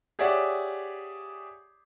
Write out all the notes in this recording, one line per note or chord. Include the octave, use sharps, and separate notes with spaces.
G4 G#4 C#5 D5 E5 F#5